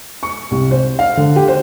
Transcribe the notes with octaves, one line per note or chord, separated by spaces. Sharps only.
C#6
C2
C5
F5
D3
G4
C5